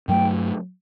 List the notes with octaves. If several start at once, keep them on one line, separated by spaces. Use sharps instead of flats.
G2 F#3 A3 G5